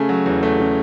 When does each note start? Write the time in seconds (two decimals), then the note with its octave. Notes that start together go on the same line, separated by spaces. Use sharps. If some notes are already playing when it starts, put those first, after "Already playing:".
Already playing: C#3 A3 G#5
0.09 F#3
0.26 E2
0.43 A3
0.60 C#3